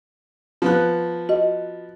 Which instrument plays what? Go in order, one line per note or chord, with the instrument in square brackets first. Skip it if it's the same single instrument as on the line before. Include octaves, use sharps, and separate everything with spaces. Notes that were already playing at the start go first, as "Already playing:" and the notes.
[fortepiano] F3 B3 F#6
[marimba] F#4 D#5